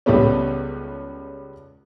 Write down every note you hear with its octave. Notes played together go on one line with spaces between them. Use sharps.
C#2 G3 A3 B3 C#4